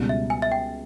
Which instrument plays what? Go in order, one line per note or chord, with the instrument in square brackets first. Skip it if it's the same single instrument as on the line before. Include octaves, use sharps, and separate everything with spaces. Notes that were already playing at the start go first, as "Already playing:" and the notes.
Already playing: [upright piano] C#2 B2 G3
[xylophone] E5
G#5
E5
G5